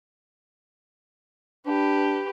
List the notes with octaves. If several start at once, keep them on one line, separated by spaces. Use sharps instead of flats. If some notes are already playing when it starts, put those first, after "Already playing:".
D4 G4 B4